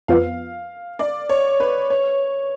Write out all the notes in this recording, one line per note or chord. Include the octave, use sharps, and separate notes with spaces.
F2 F3 B3 F5
D5
C#5
B4
C#5